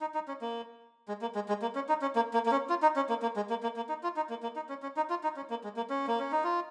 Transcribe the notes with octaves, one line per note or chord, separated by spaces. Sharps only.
D#4
D#4
C#4
A#3
G#3
A#3
G#3
G#3
A#3
C#4
D#4
C#4
A#3
A#3
A#3
C#4
F4
D#4
C#4
A#3
A#3
G#3
A#3
A#3
A#3
D#4
F4
D#4
A#3
A#3
D#4
C#4
C#4
D#4
F4
D#4
C#4
A#3
G#3
A#3
C#4
A#3
C#4
D#4
F4